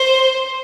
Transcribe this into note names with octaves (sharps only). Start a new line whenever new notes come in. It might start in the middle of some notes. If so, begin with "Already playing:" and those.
Already playing: C5